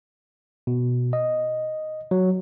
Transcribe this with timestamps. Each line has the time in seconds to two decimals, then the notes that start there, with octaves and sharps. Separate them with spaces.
0.67 B2
1.13 D#5
2.11 F#3